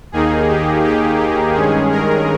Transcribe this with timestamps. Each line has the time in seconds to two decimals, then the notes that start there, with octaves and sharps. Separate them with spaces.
0.12 D#2 D#3 A#3 D#4 G#4
0.48 G4
0.84 G4
1.19 G4
1.55 G2 D#3 G#3 C#4 G#4
1.91 A#4